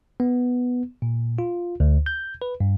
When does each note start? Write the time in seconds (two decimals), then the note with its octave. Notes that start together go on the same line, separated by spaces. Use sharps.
0.20 B3
1.02 A#2
1.39 F4
1.80 D2
2.06 G6
2.42 B4
2.60 G2